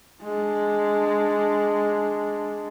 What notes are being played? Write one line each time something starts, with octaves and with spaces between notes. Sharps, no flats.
G#3 D4